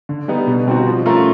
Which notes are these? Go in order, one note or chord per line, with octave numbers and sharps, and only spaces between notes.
D3
G3 B3 D#4
B2
G3 C4 D#4 F#4
F3
A3 C#4 F4 A#4